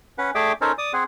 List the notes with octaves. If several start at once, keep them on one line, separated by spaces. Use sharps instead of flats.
C#4 B4 F#5
A3 G#4 D5 E5 G5
C#4 D#4 A4 A#4 C5 C#5
D5 D#6
C4 G#4 F#5